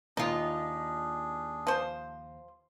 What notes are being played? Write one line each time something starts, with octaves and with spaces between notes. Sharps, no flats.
D#2 D4 D#4 F4 G#4
F3 C5